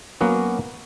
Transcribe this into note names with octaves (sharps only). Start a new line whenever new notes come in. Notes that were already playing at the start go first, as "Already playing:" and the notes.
F#3 A#3 B3 C#4 F#4